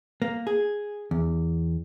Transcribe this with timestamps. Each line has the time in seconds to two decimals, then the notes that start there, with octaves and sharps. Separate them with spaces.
0.22 A#3
0.47 G#4
1.11 E2